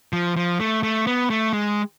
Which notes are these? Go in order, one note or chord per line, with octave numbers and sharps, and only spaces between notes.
F3
F3
A3
A3
B3
A3
G#3